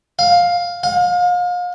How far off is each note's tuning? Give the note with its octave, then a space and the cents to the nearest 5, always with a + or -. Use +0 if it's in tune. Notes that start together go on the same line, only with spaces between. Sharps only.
F5 +10
F5 +35